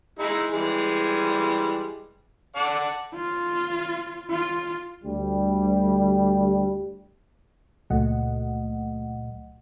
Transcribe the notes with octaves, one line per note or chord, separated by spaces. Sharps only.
G#3 D#4 E4
E3 G3 G#3
D5 F#5 A5
F4
F4
D2 G3
C#2 A#2 F#3 A3 D#5 F#5